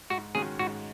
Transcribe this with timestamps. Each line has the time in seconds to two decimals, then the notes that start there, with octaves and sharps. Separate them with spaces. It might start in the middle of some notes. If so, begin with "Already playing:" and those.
0.10 G#2 F#4
0.35 D#3 G#3 C#4 F#4 G#4
0.59 G#2 F#4